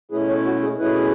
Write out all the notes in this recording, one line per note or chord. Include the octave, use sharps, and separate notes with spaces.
B2 A3 C#4 E4 G#4 B4
A4 C#5
F#4
G#4
B2 A3 C#4 E4 G#4 B4